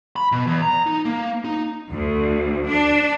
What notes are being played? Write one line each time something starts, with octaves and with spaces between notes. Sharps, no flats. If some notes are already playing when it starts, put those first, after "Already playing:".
B5
B2
E2
A#5
D#4
A#3
D#4
D2
D4